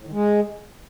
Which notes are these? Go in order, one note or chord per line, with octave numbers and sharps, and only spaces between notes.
A2
D#3
G#3